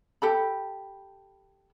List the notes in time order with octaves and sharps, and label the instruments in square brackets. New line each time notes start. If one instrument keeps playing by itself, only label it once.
[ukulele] G4 A4 B5